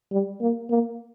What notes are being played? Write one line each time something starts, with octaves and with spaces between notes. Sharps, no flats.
G3
A#3
A#3